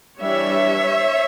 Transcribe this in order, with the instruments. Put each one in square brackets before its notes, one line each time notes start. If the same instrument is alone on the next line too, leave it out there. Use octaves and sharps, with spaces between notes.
[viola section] E3 G3 D4 C#5 E5